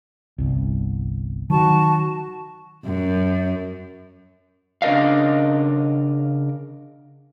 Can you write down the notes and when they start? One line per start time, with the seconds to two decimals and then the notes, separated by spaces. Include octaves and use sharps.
0.38 G1 C2
1.50 D#3 F#3 F#4 A5 C#6
2.85 F#2
4.82 C#3 D4 A#4 D#5 F5